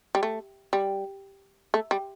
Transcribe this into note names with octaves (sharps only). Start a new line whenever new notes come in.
G3
A3
G3
A3
G3